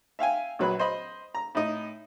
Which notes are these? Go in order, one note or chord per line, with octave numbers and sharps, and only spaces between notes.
E5 F5 G5 G#5
A#1 F#3 B4 B5
C5 D#5 B5
A#5
A2 D#4